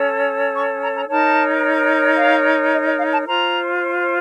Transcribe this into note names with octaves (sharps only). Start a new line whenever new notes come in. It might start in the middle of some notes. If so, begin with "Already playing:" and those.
Already playing: C#4 A4 C#5
C#6
A#5
A#5
D#4 A#4 C#5 A5
F5
D#5
D#5
F5
A5
F4 C5 A#5